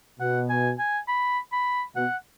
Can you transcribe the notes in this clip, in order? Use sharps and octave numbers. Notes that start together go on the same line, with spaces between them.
B2 F#5
G#5
G#5
B5
B5
B2 F#5